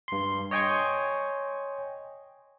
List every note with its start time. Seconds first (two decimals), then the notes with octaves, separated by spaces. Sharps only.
0.08 G2 C6
0.51 C#5 D#5 G5 G#5 C6 C#6